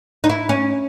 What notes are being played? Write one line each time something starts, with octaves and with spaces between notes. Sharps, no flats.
D#4
E4
C#4